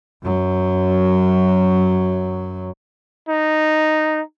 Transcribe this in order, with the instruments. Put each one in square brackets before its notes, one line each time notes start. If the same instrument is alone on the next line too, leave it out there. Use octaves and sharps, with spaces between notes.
[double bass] F#2 F#3
[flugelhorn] D#4